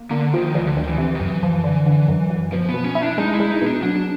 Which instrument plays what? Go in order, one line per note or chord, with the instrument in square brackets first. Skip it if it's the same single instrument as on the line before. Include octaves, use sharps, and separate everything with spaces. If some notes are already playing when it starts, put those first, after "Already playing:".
Already playing: [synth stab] A#3
[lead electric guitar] D3 [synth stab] A#3
[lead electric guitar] D#3 [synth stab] F3
[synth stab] D2 [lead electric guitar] E3
[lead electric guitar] D3
[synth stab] D2 [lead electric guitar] D#3
[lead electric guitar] E3
[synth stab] C3
[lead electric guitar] D#3
[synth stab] F#2 [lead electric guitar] E3
[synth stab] F3
D3
D3
F#2
F#2
[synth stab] B2 [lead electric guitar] F3
[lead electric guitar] B3
[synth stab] B2
[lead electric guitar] C#4
[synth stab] E4
[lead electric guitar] D4
[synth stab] G#3 [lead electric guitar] D#4
[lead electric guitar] E4
[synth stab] G#3
[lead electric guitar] D#4
[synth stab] B2
[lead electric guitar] D4
[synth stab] F#3 [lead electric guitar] D4